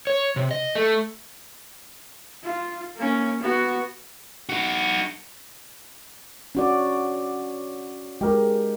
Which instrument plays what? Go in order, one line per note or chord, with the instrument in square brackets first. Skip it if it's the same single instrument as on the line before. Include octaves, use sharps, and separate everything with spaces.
[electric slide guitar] C#5
C3
D#5
A3
[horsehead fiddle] F4
A#3 C#4
B3 F#4
[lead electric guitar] D#4 F#4
[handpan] C#4 F#4 D5
[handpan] G#3 [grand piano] G4 A#4